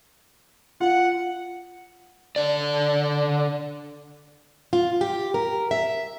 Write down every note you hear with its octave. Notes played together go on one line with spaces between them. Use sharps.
F4 F#5
D3 D5
F4
G4
A#4
E5